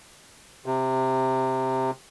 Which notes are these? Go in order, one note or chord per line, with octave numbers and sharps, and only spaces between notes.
C3